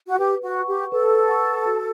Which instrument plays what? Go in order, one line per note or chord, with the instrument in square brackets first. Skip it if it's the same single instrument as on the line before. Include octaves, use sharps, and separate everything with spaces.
[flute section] F#4
[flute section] G4 [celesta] B4
[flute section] F#4
[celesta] F#5 C#6
[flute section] G4
[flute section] A4 [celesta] B4
[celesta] F#5 C#6
F#4